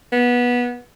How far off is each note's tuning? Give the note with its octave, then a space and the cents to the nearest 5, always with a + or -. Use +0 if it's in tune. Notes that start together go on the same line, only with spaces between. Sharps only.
B3 -20